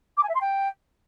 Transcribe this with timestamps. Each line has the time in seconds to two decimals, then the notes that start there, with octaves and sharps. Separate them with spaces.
0.17 D6
0.23 G#5
0.29 E5
0.35 C6
0.41 G5